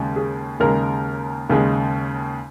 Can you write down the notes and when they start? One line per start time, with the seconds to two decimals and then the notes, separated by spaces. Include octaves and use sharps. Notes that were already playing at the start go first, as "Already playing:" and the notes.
Already playing: D#2 C#3 G#3
0.16 G#4
0.60 D#2 C#3 G#3 A#4
1.50 D#2 C#3 G#3